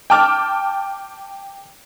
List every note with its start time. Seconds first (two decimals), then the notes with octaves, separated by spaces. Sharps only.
0.10 G5 A5 D6 F6